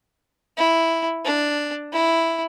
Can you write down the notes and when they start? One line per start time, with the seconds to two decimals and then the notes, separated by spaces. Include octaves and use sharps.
0.57 E4
1.25 D4
1.93 E4